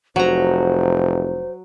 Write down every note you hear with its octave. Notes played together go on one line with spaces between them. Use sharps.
F1 F#3 C5 A#5